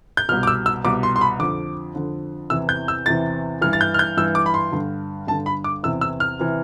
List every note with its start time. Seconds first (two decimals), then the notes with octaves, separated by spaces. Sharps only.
0.17 G6
0.29 B2 F6
0.32 C2
0.43 D6
0.47 E6
0.66 E6
0.84 C2 B2 D6
1.03 C6
1.16 C6
1.21 B5
1.39 F2 D3 D6
1.95 F2 D3
2.50 E2 C3 E3 E6
2.69 G6
2.88 E6
3.06 E2 C3 E3 A6
3.61 G2 E3 F6
3.73 A6
3.81 G6
3.94 F6
3.99 G6
4.17 G2 E3 E6
4.35 D6
4.46 B5
4.54 C6
4.72 G2 D3
5.27 G2 A5
5.31 D3
5.46 B5
5.64 D6
5.83 E2 C3 E3 E6
6.01 E6
6.20 F6
6.39 C3 E3